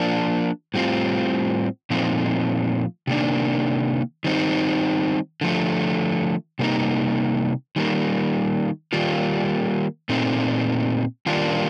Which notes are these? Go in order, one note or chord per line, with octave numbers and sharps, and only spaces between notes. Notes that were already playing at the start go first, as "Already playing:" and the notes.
Already playing: F3 A#3 D4
A2 G3 C4 F4
A#2 F3 A3 C4 D#4
C3 D#3 A#3 D4
D#3 G3 C4 D#4
D3 F3 A3
C3 G3 A#3 D#4
D#3 G3 A#3
D#3 G3 A#3 F4
A#2 A3 C4 D#4
D#3 G3 A#3 D4 F4